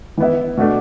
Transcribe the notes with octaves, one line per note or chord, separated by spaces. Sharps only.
E3 B3 E4
B2 A3 D4